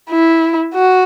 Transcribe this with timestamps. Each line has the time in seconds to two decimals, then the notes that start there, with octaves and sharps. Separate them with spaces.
0.10 E4
0.75 F#4